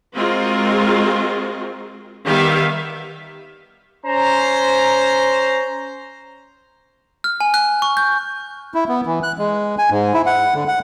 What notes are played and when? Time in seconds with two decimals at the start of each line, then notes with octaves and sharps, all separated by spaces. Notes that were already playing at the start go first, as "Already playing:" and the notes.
0.15 G#3 C4 F4 F#4 A#4 D#5
2.26 D#3 G3 B3 G4 E5 F5
4.06 C#4 C5 A#5
7.24 F6
7.41 G#5
7.54 F#6
7.82 C#6
7.97 G6
8.74 E4
8.89 B3
9.06 E3
9.23 F#6
9.38 G#3
9.78 G#5
9.90 G#2
10.14 E4
10.26 F#5
10.54 D3
10.68 F#5